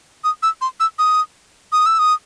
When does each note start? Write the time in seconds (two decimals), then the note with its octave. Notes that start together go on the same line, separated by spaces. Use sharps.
0.24 D#6
0.43 E6
0.61 C6
0.80 E6
0.99 D#6
1.72 D#6
1.86 E6
1.99 D#6